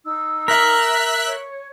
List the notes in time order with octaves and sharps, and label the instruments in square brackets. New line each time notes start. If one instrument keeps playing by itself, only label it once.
[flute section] D#4 E6
[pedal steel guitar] A#4 [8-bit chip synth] E5 F#6 B6
[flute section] C#5